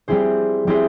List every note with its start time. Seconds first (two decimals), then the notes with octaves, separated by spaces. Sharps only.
0.08 G3 C4 E4 G#4 C5
0.67 G3 C4 E4 G#4 C5